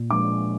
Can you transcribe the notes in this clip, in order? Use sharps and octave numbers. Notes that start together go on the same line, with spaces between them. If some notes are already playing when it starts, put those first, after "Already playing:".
Already playing: A#2
F3 G#3 D4 D6